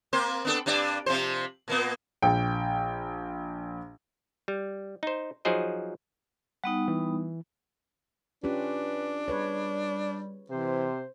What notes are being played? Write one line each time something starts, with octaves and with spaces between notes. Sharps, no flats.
A#3 C4 C5
B3 D4 A4
G2 D4 D5
C3 F3 C5
A#2 A#3 B3
A#1 G5
G3
D#4 C5
F3 F#3 D#4 G#4 C5 D#5
G3 B3 D#4 F#5
E3
C#4 D4 F4 G4 B4
G3 G#4 B4 C#5
C3 E3 C5